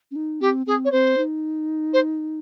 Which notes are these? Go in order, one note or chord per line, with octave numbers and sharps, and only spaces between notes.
C#4
D#4
C4 G4
C4 G#4
C#5
C4 C5
D#4
C5